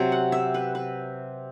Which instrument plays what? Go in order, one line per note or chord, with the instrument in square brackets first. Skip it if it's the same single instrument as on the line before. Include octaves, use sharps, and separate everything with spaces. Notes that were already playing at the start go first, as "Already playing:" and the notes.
Already playing: [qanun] C3 F#3 C4
F#5
E5
B4
B4